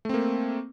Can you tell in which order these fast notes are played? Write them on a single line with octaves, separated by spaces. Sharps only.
A3 C4 A#3